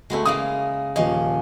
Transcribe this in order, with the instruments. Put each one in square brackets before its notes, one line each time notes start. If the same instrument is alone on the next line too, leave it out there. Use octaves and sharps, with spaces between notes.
[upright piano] D2 A3 [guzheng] G#3 B3 E4
[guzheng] C#3 G#3 A#3 [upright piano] D#6
[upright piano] D#1 D#5 [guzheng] F3 C#4